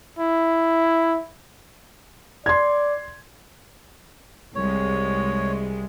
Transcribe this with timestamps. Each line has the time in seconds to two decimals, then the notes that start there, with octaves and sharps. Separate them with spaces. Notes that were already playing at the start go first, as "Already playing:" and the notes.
0.19 E4
2.46 D5 C6 G#6
4.55 C2 G#3 C#5